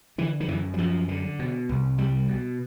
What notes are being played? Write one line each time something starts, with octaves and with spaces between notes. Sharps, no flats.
D3 E3
D#3
F#2 E3
F#3
F#2 F3
D3
B2
C2
C2 G3
B2